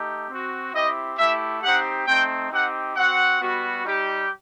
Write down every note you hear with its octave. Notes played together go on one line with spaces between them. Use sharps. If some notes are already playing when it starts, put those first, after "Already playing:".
Already playing: A3 D#4 G4
C4 F#4
C4 E4 G4 D#5
A3 E4 G4 E5
C4 D#4 G4 F#5
A3 C4 D#4 G5
C4 D#4 G4 F#5
C4 F#4 F#5
G3 B3 F#4
G3 D#4 G4